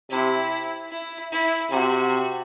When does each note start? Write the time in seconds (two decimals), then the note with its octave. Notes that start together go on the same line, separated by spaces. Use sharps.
0.10 C3 E4
0.91 E4
1.32 E4
1.71 C3 F#4